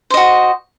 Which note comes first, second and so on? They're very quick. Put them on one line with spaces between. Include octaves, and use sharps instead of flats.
C5 D#5 F#4